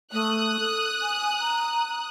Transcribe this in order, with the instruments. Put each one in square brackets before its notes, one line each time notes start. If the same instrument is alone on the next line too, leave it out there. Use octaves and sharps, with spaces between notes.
[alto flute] A3 [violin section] D#6 F#6
[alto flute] A4
G#5
A#5